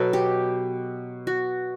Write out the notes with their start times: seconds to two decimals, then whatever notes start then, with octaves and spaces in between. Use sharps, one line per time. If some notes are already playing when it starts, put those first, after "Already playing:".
Already playing: B2 F#3 B3 A4
0.13 G4
1.27 F#4